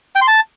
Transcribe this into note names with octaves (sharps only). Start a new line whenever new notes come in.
G5
C6
A5